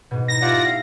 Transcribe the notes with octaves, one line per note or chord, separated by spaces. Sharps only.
G#2 B2
D#4 E4 A#6
A3 F4 G4 D5 E5 F#5
F5